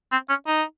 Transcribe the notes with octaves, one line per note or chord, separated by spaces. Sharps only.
C4
C#4
D#4